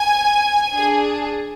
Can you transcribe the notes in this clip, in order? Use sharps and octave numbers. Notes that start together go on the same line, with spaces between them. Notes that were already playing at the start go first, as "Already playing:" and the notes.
Already playing: G#5
D4 G#4